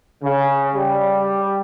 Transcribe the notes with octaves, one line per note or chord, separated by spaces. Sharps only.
C#3
G3